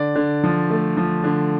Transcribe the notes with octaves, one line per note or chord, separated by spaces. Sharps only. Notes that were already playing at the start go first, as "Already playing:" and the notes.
Already playing: D3 D5
D3
F3
A3
F3
D3